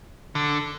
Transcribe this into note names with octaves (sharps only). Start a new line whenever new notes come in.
D3